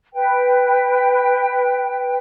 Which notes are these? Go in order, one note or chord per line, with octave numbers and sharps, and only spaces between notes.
B4 G5